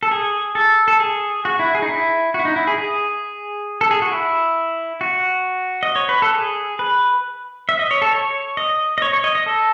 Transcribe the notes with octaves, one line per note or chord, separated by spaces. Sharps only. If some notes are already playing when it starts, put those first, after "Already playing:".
A4
G#4
A4
A4
G#4
F#4
E4
G#4
D#4
E4
F#4
E4
D#4
E4
G#4
G#4
A4
G#4
F#4
E4
F#4
D#5
C#5
B4
A4
G#4
B4
E5
D#5
C#5
A4
C#5
D#5
D#5
C#5
C#5
D#5
D#5
A4